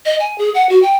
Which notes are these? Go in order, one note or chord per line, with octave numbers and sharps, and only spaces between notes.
D#5
G#5
G#4
F#5
F#4
G5